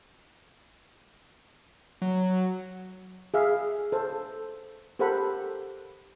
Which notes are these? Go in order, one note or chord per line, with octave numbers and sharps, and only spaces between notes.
F#3
G#4 E5 F5
A4 C5
G4 A4 A#4 C5 F#5 B5